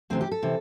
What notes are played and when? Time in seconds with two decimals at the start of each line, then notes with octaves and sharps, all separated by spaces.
0.10 D2 C3 E3 C4
0.21 G4
0.32 A4
0.43 C3 E3